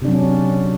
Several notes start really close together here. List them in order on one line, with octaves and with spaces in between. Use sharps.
C3 D4 F#3 C#4